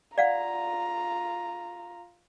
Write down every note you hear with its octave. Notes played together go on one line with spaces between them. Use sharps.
F4 D5 F5 F#5 A#5